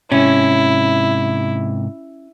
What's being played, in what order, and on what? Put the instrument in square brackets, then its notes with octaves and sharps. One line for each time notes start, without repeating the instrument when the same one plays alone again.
[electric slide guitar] G#2 C3 [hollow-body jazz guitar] C#4 [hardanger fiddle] E4